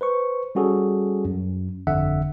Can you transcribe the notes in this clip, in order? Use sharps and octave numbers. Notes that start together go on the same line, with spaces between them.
B4 C5 C#6
G3 C#4 F#4 G#4 A4
F#2
G1 F2 D3 E5 F#5